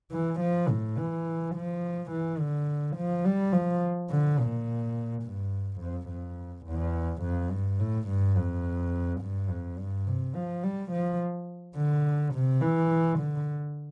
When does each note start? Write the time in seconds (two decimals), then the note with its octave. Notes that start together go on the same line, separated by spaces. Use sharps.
0.12 E3
0.40 F3
0.69 A2
0.98 E3
1.55 F3
2.11 E3
2.39 D3
2.96 F3
3.25 G3
3.52 F3
4.10 D3
4.39 A#2
5.23 G2
5.80 F2
6.09 F2
6.66 E2
7.23 F2
7.51 G2
7.79 A2
8.08 G2
8.37 F2
9.21 G2
9.49 F2
9.78 G2
10.07 C3
10.35 F3
10.63 G3
10.92 F3
11.77 D3
12.34 C3
12.61 E3
13.19 D3